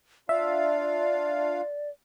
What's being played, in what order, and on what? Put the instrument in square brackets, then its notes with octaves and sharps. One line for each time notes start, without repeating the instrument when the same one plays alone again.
[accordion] D4 F4 F5 [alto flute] D5 [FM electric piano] E5